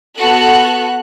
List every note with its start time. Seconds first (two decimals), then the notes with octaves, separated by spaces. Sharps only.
0.18 B3 F#4 A4 F#6